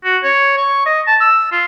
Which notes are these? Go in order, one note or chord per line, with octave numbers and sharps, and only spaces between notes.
F#4
C#5
C#6
D#5
A5
E6
F4